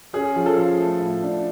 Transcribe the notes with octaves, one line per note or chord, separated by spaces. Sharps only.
C#4 G#4
F3
A4
F3
A3
A2
D4